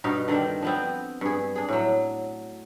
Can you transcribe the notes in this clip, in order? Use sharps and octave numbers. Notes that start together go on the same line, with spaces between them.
G2 B2 D#4 F5
D3 D#3 C4 D4
F3 B3 C4
G2 G#4
D4 G#4
A2 F#3